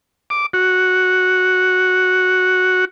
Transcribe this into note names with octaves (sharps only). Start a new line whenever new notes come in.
D6
F#4